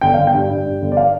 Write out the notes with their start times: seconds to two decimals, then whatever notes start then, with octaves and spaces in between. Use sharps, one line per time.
0.01 G1 G5
0.14 G1 F5
0.27 G5
0.33 G2
0.49 G2
0.66 G2
0.82 G1
0.92 D5
0.97 F5